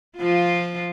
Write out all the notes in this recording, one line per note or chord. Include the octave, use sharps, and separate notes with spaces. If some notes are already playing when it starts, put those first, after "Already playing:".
F3 F4